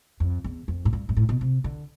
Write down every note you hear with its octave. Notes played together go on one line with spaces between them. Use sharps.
F2
E2
F2
A2
G2
G2
A2
B2
C3
D3